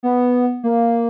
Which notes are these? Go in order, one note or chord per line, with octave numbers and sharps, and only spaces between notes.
B3
A#3